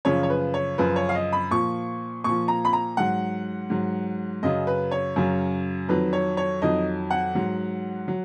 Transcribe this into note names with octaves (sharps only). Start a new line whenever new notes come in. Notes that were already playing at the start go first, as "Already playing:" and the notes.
F#2 C#3 F3 C#5
C#5
B4
C#5
F#2 C#3 F3 B4
C#5
F5
D#5
B5
A#2 F3 C#6
A#2 F3 C#6
A#5
B5
A#5
G#2 F#3 F#5
G#2 F#3
F#2 C#3 F#3 D#5
B4
C#5
F#2 C#3 F#3
F2 D#3 F#3 B4
C#5
C#5
F2 D#3 F#3 D#5
F#5
G#2 F#3
F#3